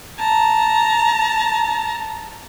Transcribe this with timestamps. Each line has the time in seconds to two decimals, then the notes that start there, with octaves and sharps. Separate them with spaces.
0.19 A5 A#5